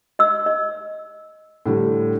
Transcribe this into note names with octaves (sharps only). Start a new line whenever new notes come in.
D#5 E6
D#5
A2 D3 G3